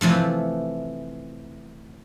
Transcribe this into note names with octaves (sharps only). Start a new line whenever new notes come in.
C3 E3 F3 A3